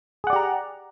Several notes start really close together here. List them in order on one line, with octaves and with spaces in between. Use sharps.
G#4 F#5 D5 G4 A#5